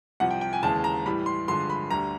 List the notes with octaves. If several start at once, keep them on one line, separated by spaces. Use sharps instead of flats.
C2 C3 F3 F#5
G5
G5
G#5
D#2 C#3 E3 G#3 A5
A#5
A2 E3 G3 B5
C6
G2 D3 F3 G#3 C6
B5
D2 D3 G3 A#5